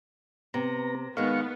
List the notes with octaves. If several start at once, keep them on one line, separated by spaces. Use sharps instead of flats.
C3 B3 A#5
D#3 G#3 B3 F5 C#6